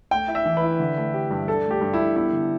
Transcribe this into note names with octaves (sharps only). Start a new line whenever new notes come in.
A3 G5
E4
E5
E3
B4
E4
D3
A3
G4
G2
D4 A4
A3
G4
G2
E4
G2
B3 E4
D3